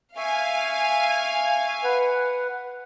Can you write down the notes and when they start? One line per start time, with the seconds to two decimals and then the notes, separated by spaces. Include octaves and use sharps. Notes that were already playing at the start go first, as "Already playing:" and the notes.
0.17 E5 F5 G#5 C#6
1.84 B4 F#5